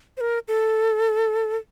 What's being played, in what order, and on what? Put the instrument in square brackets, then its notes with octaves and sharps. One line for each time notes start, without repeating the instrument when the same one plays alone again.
[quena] C5
A#4
A4